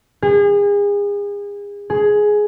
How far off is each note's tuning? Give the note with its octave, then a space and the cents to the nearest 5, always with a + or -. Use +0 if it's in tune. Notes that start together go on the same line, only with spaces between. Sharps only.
G#4 -35
G#4 +10